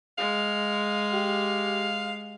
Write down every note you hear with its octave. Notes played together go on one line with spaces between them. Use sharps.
G#3 F5
G4